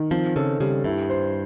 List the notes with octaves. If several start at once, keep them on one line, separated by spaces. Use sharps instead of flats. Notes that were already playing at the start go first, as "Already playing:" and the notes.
Already playing: D#3
F3 C4
C#3 A4
C#3 G3
G2 E4
C5